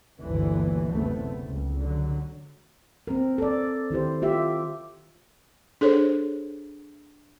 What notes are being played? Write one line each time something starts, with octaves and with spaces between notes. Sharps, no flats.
G1 D2 A#2 D3 E3
F#1 D2 C3 A3 B3
C#2
D3 F#3
C4 A#4
A4 D5
D#3 E4 G4 C5
F4 G4 E5
D4 G#4 A4 C5 C#5